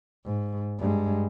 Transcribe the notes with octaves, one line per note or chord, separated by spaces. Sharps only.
G#2
G2 G#3